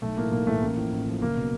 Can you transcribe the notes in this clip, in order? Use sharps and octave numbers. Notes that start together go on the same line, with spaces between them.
B1 A3
A2 E3 A#3
B1 A#3
A2 E3 A3
A1 A#3
A2 F3
A1
A2 F3
F#1 A#3
B2